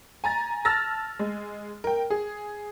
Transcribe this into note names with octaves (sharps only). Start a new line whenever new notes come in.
G#5 A#5 A6
A5 E6 F6 A6 A#6
G#3
A#4 G5
G#4